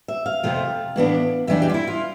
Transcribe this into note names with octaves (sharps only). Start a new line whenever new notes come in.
E5
F5
F2 C3 F3 A3
A2 E3 B3 D4
F2 E3 G3 D4 E5
G4
F4
E4
F4